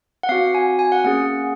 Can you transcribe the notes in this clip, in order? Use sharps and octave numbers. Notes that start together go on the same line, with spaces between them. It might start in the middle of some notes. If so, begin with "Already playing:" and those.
F#5
C4 F#4 F5
G#5
G#5
F#5
A#3 C#4 G#4 F#5